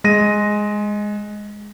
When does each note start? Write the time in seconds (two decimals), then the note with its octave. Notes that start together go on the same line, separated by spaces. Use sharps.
0.04 G#3 A#6 D#7